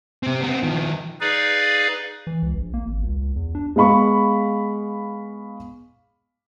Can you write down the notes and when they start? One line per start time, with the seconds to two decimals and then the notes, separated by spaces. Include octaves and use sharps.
0.23 C3 C4
0.41 B3 C4
0.63 D#3 F3
1.21 D#4 G#4 B4 D5 F5
2.27 E3
2.43 C#2
2.55 A#1
2.74 A#3
2.87 G#1
3.03 C#2
3.16 C#2
3.36 E2
3.55 D4
3.76 G#3 B3 F5 B5 C#6